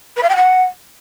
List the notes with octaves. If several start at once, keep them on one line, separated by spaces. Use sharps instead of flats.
B4
F5
G5
F#5